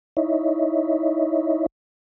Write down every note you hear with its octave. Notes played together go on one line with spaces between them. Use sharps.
D#4 E4 C#5 D#5 E5